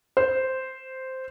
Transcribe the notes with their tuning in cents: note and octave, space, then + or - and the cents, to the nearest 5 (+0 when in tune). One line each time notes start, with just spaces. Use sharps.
C5 -5